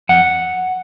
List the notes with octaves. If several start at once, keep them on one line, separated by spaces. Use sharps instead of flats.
F2 F#5